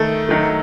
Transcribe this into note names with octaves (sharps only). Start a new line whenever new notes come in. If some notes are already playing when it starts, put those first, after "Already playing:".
Already playing: D#3 A3 A4
D#3 F#3 A3